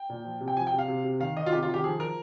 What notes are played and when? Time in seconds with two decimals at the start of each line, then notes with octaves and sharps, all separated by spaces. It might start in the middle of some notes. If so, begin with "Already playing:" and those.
Already playing: G5
0.09 A#2
0.24 F3
0.40 C3
0.48 G5
0.57 F3 G#5
0.67 G5
0.73 C3
0.78 F5
0.88 C3
1.04 C3
1.20 D#3 F5
1.36 D#3 D#5
1.46 F4
1.52 C3 G4
1.62 F4
1.69 D#3
1.74 G4
1.84 F3 G#4
2.00 F3 A#4